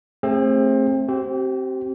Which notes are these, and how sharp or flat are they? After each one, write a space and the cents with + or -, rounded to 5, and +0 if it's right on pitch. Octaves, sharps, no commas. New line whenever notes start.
A3 +0 C4 +25 G#4 -30
C4 +10 G4 -35